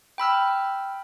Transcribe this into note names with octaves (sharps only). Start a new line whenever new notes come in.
G5 B5 E6 F6